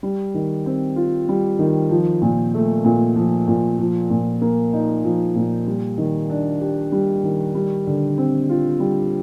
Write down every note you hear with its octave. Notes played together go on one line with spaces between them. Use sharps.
G3
D#3
C4
F4
G3
D#3
F3
A#2
A3
A#2
F3
A#2
F3
A#2
A#3
D#4
F3
A#2
G3
D#3
D4
G4
G3
D#3
G3
D3
C4
F4
G3